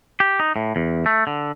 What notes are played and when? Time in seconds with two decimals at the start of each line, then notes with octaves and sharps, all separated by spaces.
0.20 G4
0.40 D#4
0.56 A2
0.76 E2
1.06 A3
1.27 D3